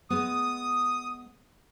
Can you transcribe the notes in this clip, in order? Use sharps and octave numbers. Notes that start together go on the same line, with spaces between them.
G#3 B3 D#6